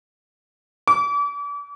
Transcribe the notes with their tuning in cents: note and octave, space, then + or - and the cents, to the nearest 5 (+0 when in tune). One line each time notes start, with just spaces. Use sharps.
D6 -35